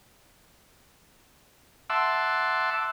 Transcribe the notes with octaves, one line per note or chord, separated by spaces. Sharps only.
E5 F#5 A5 C6 D6 E6